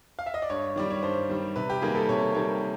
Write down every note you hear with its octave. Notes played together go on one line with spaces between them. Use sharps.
F5
E5
D#5
D5
G2 C#5
D#3 G3 D5
C#5
G2 C5
D#3 G3
C3 B4
G4
D#3 G3 A#3 G#4
A4
C3 C#5
D#3 G3 A#3 C#5